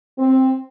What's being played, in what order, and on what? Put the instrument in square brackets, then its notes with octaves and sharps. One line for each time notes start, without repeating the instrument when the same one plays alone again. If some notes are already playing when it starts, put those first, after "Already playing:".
[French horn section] C4